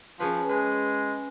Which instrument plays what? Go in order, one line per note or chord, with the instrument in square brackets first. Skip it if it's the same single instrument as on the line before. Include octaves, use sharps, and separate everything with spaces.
[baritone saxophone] F3 [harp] C#4 G#4 B4
[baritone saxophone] G#3 [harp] B4